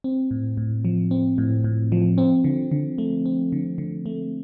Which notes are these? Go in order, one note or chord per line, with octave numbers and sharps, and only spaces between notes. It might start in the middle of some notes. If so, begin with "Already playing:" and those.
C4
A2
A2
F3
C4
A2
A2
F3
C4
D3
D3
A3
C4
D3
D3
A3